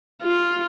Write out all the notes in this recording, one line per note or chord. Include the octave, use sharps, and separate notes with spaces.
F4